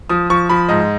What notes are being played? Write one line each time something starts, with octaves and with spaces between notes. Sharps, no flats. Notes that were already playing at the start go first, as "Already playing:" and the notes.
F3 D#6
F3 C#6
F3 B5
G#2 D#5